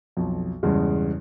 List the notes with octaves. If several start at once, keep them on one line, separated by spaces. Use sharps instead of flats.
B1 F2
E2 G2 C#3 G#3